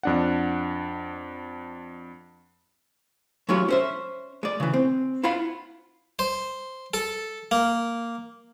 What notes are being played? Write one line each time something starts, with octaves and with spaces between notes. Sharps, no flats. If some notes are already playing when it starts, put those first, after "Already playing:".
F2 D4 F#5
F#3 G#3 E4 F4 G4 C#5
C#4 C5 E5
G#3 D5
C#3 E3
C4
E4 F4 F5 F#5 B5
C5
A4
A#3